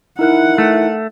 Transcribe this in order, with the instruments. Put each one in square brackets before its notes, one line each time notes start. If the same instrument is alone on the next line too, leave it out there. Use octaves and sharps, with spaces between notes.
[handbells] D#4 A#4 F#6 [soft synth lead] E4 [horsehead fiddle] F#5
[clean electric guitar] A3